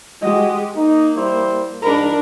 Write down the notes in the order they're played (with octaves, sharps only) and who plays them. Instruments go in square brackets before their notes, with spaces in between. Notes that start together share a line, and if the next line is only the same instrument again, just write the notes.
[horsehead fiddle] G#3 G4 [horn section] F#4 D#5
[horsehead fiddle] A#3 [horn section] D#4
[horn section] G3 E4 C5
[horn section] G#2 A#5 B5 [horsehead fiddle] D4 A#4